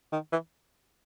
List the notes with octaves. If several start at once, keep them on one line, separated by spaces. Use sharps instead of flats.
D#3
E3